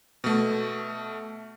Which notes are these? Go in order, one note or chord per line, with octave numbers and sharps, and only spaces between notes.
B2 A3